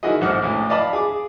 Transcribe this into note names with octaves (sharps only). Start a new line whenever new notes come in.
D#3 E4 F#4 G#4 D#5
A1 G#2 C5 F#5 D#6 F6
A1 D2 A2
D5 D#5 F5 A5 B5 D#6
G#4 D6